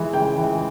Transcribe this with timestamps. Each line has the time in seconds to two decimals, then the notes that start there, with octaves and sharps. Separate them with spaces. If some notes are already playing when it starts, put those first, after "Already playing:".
Already playing: E3 G#3
0.13 C#3 G5
0.38 E3 G#3